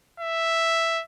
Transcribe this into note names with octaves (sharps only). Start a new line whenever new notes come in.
E5